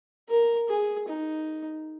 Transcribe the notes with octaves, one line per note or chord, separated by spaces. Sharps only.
A#4
G#4
D#4